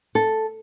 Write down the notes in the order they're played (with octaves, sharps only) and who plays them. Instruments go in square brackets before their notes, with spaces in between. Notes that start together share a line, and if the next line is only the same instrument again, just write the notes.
[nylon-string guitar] A4